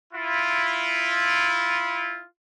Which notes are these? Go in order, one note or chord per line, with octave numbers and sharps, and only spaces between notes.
E4 F4